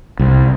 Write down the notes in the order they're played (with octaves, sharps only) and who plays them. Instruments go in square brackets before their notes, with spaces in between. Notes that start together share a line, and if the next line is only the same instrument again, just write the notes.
[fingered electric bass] C2